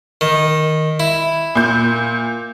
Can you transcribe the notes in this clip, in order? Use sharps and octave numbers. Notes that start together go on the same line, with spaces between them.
D#3
E4
A#2 G6